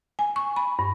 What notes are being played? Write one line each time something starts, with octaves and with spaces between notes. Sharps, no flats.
G#5
C#6
B5
G2